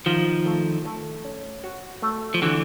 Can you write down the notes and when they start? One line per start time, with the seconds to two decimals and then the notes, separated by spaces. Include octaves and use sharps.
0.06 D#3 F3 F4
0.46 A3
0.85 A3
1.24 C#4
1.64 F#4
2.02 A3
2.34 F3
2.42 D3 E3 F#4